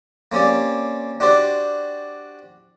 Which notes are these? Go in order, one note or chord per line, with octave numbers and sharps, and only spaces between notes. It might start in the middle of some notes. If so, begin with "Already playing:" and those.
A#3 C4 C#4 G4 D5
D4 F#4 G4 C5 D5